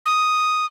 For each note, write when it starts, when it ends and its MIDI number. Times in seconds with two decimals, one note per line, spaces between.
0.06 0.66 87